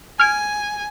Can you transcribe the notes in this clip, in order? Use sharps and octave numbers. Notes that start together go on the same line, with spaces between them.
G#5 F6 G#6 D7